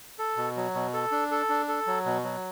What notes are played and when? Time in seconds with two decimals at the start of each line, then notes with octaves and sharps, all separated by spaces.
0.19 A4
0.37 B2
0.57 F#3
0.75 B2
0.94 A4
1.12 D4
1.31 A4
1.49 D4
1.68 A4
1.87 F#3
2.06 B2
2.24 F#3